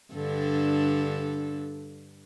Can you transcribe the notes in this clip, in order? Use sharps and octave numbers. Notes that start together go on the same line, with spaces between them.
G2 D3 A4